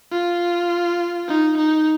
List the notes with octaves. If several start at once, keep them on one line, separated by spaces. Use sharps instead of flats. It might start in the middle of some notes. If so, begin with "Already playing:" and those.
F4
D#4
D#4